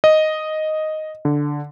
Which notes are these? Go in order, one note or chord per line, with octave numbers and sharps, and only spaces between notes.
D#5
D3